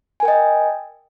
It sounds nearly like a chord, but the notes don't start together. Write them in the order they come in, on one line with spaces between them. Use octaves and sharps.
G#5 A#4 G5 D#5